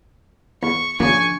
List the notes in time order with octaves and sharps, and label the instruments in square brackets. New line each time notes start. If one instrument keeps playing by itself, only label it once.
[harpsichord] E2 [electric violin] C#6
[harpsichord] A#2 C#3 [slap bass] F3 D4 [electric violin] G#5 C#6